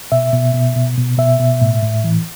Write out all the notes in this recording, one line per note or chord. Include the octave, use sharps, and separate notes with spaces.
B2 E5
B2
B2
B2
B2
B2 E5
B2
A2
A2
E3